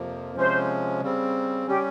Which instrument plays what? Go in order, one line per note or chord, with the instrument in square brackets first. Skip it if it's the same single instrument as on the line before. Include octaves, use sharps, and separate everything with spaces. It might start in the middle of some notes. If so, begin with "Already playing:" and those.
Already playing: [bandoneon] F2 C3 F3 A#3
[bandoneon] C3 F3 G#3 C#4 [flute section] C5
[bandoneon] C#3 G3 C4
[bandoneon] G3 C#4 [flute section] G4